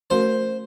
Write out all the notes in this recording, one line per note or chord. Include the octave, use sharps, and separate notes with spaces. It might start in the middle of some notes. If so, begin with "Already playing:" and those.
A3 C#4 F#4 A#4 C5